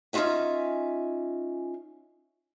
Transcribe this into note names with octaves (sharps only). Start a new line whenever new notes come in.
C#4 D#4 F4 F#4 E5 G#5